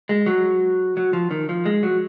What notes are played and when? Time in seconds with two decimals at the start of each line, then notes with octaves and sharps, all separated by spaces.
0.09 G#3
0.26 F#3
0.97 F#3
1.13 F3
1.31 D#3
1.49 F3
1.66 G#3
1.83 F#3